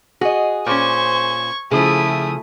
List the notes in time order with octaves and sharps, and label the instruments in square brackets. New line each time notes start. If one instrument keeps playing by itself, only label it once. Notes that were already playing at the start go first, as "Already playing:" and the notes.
[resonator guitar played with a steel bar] F#4 D#5 [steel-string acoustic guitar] G#4
[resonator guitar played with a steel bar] A#2 C#4 [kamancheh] C5 [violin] C#6 G#6
[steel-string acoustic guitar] C#3 F3 [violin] A3 [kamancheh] E4 D#6 [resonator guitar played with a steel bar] G#4